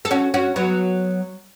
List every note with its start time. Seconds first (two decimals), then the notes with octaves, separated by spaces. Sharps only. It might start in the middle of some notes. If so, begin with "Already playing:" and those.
0.05 A4
0.11 C#4 F#4
0.34 C#4 F#4
0.56 F#3 B3